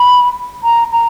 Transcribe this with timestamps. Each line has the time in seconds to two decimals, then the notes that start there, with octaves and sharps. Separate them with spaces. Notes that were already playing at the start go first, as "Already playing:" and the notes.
Already playing: B5
0.63 A#5
0.92 A#5